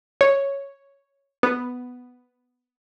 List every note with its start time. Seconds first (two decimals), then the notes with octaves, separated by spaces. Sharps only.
0.21 C#5
1.43 B3